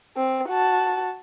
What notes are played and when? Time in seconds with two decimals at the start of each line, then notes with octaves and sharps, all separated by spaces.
0.17 C4
0.49 F#4 A5